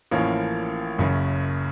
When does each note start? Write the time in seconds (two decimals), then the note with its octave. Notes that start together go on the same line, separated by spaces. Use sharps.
0.11 A1 A2 F3 A#3 C#4
0.98 F#1 F#2 C#3